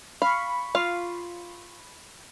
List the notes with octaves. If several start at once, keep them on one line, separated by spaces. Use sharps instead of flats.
F5 B5 C#6
F4 F5